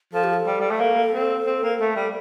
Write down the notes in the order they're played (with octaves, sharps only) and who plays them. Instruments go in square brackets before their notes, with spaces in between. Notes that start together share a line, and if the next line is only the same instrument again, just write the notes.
[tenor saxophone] F3 [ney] A4
[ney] G4
A4
[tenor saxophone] G3
G3
A3
A#3
C4
C4
A#3
A3
G3